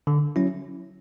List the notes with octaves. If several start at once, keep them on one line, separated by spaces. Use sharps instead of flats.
D3
F#3 C#4 E4